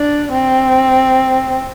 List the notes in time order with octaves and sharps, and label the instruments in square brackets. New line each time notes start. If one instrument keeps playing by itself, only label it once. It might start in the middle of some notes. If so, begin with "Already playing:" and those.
Already playing: [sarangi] D4
C4